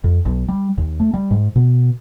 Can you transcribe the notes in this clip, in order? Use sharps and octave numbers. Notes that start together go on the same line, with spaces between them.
F2
B1
G3
D#2
A3
G3
G#2
B2